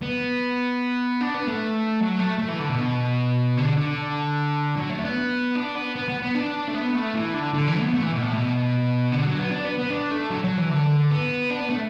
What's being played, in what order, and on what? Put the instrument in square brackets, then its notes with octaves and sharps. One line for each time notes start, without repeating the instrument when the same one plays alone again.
[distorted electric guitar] B3
D4
B3
A3
F#3
A3
A3
E3
D3
B2
D3
D3
F#3
A3
D4
B3
D4
B3
B3
B3
B3
D4
A3
B3
A3
E3
D3
D3
E3
B3
A3
E3
B2
A2
B2
D3
F#3
B3
D4
B3
B3
D4
A3
F#3
F#3
E3
D3
B3
D4
B3
A3